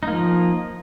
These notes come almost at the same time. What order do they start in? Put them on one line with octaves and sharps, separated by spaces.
D#4 A#3 F3